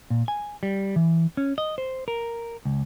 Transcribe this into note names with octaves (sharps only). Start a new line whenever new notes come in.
A#2
G#5
G3
E3
C#4
D#5
C5
A#4
C#2